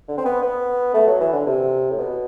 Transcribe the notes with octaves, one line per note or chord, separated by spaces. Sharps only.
D3
C4
B3
B3
A3
F#3
E3
D3
C3
A2
B2